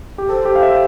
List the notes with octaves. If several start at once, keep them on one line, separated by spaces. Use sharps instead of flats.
G4
A4 C5
G4
F5
E5